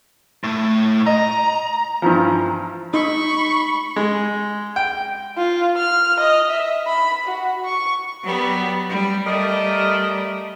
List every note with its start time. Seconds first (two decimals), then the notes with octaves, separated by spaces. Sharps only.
0.44 A2 A3
1.06 D#5 A#5
2.02 G2 E3 F3
2.94 D#4 B5 C#6
3.96 G#3
4.76 G5
5.37 F4
5.77 F6
6.20 D#5
6.50 E5
6.87 B5
7.28 F#4
7.65 C#6
8.23 F#3 G3 B3
8.90 G3
9.26 G3 A3 A#4 D5 D#5